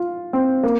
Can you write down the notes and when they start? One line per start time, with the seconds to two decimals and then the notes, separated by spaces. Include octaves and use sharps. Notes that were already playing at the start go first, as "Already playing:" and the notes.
Already playing: F4
0.33 C4
0.63 A#3